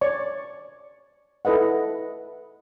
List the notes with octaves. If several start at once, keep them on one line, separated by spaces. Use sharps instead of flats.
C#5 D5 C#6
E4 A4 B4 D#5 F#5